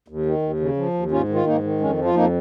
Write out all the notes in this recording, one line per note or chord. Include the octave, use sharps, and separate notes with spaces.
D#2
D#3
D#2
C#3
F3
D#2
G#2 C#4 F4
D#3
F4
G#2 A#3 D#4
D#3
F2 G#3 C#4
F3
F4
F2 A#3 D#4